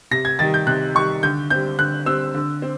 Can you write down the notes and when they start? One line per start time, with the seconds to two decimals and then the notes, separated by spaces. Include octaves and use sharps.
0.11 C3 A#6
0.25 G#6
0.39 D#3 G3 A6
0.54 G6
0.67 C3 F#6
0.95 D#3 G3 C#6
1.23 D3 G6
1.50 G3 C4 G6
1.79 D3 F#6
2.06 G3 C4 E6
2.34 D3
2.62 C4